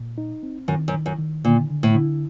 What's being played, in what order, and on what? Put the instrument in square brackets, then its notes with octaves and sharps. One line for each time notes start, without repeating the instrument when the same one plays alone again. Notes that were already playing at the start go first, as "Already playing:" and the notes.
Already playing: [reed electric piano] A#2
D#4
C4
[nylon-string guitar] F#2 [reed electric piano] D#3
[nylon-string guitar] F#2
[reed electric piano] D#3
[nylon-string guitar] F#2
[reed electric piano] D#3
[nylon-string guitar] A#2 [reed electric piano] D3
[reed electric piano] D3
[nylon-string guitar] A2
[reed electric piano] D3